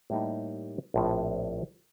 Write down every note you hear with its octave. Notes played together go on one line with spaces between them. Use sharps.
A2 G3 A#3 D#4
A#1 A2 F3 C4